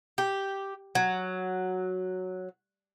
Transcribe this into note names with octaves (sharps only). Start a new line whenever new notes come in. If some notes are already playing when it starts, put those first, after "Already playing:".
G4
F#3